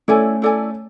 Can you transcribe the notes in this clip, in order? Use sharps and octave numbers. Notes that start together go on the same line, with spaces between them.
A3 C#4 E4 A4 D5 G#5
E4 A4 D5 G#5